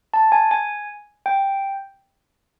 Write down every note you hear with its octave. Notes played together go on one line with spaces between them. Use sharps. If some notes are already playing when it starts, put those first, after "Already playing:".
A5
G#5
G#5
G5